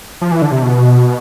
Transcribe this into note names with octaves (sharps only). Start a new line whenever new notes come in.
F3
E3
D3
C3
B2